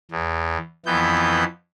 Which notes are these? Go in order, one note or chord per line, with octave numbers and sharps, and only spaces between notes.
E2
F2 E3 B3 G6